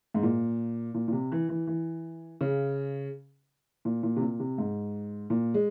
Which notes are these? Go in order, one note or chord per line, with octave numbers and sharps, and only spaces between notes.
G#2
A#2
A#2
A#2
C3
E3
E3
E3
C#3
A#2
A#2
C3
A#2
C3
G#2
A#2
G#3